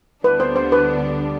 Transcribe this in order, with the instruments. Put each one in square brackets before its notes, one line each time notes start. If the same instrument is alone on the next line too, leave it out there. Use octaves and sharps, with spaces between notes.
[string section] D2 D3 G3 B3 D4 [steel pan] B4
[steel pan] C5
C5
B4